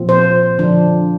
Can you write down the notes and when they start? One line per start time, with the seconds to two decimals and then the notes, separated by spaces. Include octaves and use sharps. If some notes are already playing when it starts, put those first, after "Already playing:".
Already playing: A#2 F3 C4
0.09 C5
0.59 D3 F3 D4